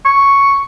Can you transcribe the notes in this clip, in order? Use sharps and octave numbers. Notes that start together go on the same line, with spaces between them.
C#6